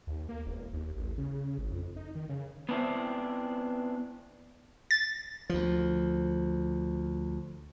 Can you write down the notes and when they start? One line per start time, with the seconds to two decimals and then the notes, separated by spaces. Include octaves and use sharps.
0.07 D#2
0.29 A#3
0.46 E1
0.73 D#2
0.97 A1
1.18 C#3
1.58 G#1
1.71 F2
1.96 D#4
2.15 D#3
2.29 C#3
2.69 B3 C4 D4 E4 C5
4.91 A6
5.50 D2 F3